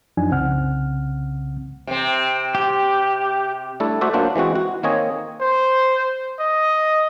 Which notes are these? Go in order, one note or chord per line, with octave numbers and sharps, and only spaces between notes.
F#2 F3 D4 D#4 G#5
C2 C#3 C4 F#5 F6
C3 C4
G4
G3 A3 D4 E4 A4
A3 F#4 C5 D5 E5
F#3 A#3 D4 F4 C5 F#5
E3 G#3 C4 F#4
F#4
D#3 A#3 C4 C#5 D#5 G#5
C5
D#5